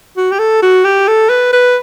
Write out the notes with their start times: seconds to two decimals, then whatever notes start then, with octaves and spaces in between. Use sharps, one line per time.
0.17 F#4
0.31 G4
0.39 A4
0.62 F#4
0.84 G4
1.08 A4
1.29 B4
1.53 B4